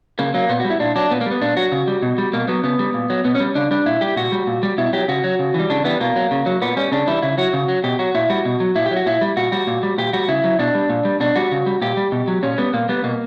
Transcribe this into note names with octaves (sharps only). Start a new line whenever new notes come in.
C#3 A#3
F#3 A#3
A#2 B3
G3 F#4
E4
A#2 D4
F#3 D4
A#2 B3
A#3
G3
B3
A#2 D4
F#3 F#4
C#3
G3
B2
G3
B2 A#3
F#3 B3
C#3 B3
G3
A#2
F#3
B2 B3
C#4
G3
C#3 D4
G3 D4
A#2 E4
G3 G4
A#2 F#4
G3
A#2
G3
B2 E4
F#3 G4
C#3 F#4
F#3
C#3
E3 G3
C#3 D4
E3 G3 B3
B2 A#3
F#3
C#3
F#3
A#2 B3
G3 C#4
C#3 D4
E3 G3 E4
C#3 E4
F#3 F#4
C#3
F#3
B2 G4
F#3 F#4
A#2 E4
G3 F#4
B2
F#3
A#2 E4
G4
F#3
F#4
A#2 E4
G3
A#2 F#4
G3 F#4
A#2
G3
A#2 G4
G3 F#4
C#3 E4
F#3
B2 D4
G3
A#2
G3
B2 D4
G3 F#4
C#3
G3
A#2 G4
G3
B2
F#3
A#2 C#4
G3 B3
A#2 A#3
G3 B3
B2 A#3